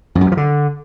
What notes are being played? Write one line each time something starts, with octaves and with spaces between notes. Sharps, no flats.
F2
F#2
G2
F3
D3